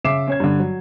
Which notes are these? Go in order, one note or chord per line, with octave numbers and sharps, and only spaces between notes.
C#3 E5 D6 C7 E7
C#4 C#5 G#6
G2 D3
F#3